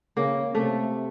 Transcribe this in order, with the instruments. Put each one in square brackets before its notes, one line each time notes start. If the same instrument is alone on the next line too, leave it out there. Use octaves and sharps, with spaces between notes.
[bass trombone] C#3 [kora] A#3
[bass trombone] C3 [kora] A3